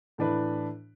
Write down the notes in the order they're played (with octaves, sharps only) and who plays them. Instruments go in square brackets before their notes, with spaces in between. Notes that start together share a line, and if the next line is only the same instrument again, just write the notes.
[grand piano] A2 E3 D4 B4